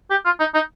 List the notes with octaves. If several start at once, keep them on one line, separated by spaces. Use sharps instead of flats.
G4
F4
D#4
D#4